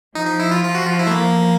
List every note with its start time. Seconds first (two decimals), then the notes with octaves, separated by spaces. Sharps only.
0.15 F3 D#4
0.27 D#4
0.40 E4
0.51 F4
0.63 F3 F4
0.75 F#4
0.87 F4
0.99 E4
1.07 A3
1.11 F3 A#3